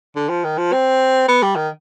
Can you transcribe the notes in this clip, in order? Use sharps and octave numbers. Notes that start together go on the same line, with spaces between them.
D3
F3
D#3
F3
C4
B3
G3
D#3